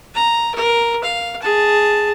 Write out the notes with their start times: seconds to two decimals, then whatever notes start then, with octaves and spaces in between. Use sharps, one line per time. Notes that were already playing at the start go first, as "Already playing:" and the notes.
0.15 A#5
0.55 A#4
1.04 F5
1.42 G#4 A5